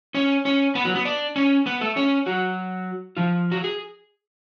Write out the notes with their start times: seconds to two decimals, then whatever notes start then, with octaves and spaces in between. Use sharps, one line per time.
0.14 C#4 C#5
0.45 C#4 C#5
0.75 B3 B4
0.85 F#3 F#4
0.95 B3 B4
1.05 D4 D5
1.36 C#4 C#5
1.66 B3 B4
1.81 A3 A4
1.96 C#4 C#5
2.26 F#3 F#4
3.17 F3 F4
3.52 F#4
3.64 G#4